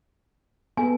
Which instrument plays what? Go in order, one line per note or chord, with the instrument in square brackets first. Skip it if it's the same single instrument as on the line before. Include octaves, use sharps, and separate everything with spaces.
[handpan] B3 A4 [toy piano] G#5